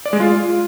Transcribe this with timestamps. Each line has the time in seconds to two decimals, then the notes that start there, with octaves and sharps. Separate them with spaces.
0.06 D5
0.13 G#3
0.20 F4